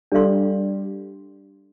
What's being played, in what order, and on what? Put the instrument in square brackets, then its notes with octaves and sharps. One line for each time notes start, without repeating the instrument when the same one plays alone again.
[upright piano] G3 [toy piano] D4 A4 D5 F5 C6